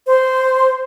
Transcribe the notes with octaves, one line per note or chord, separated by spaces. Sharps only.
C5